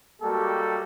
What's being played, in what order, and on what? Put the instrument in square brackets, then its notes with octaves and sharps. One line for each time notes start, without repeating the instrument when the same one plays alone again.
[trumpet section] G3 G#3 A#3 F#4 G4 A4